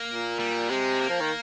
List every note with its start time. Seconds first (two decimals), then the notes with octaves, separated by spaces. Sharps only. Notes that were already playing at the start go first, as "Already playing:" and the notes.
Already playing: A#3
0.09 A#2
0.39 G3
0.70 C3 G#3
1.01 A#3
1.10 F3
1.20 D#3